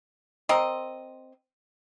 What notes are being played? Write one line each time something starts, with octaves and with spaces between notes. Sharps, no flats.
C4 A#4 D#5